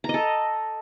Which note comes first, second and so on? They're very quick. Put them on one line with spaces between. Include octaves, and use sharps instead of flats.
A#5 D#5 A4